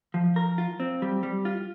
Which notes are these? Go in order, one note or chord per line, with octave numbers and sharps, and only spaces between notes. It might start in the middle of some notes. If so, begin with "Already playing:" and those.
F3
A#4
F4
C4
G3
G3
F4